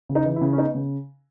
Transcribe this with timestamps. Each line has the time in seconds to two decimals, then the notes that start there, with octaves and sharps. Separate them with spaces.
0.09 C#3
0.15 D#4
0.25 E3
0.36 E4
0.41 C#3
0.53 C#4
0.58 B3 D#4
0.75 C#3